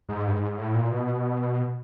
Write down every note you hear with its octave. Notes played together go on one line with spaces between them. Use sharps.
G#2
G2
G#2
A2
A#2
B2